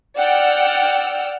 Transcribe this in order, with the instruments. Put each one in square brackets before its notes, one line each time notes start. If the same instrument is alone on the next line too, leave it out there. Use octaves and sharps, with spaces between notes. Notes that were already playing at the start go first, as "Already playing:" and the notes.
[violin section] D5 F#5 G5 E6 F6